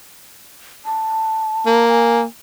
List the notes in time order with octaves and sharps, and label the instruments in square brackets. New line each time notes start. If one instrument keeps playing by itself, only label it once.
[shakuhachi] A5
[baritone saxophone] A#3
[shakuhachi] G#5